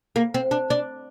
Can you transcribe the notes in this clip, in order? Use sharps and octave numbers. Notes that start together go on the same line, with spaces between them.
A#3
C4
D4
D4